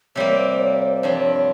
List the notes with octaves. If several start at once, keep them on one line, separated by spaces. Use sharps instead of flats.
C3 G3 A#3 C#5
C5
C#5
C5
C5
G2 F3 C4 C#5
C#5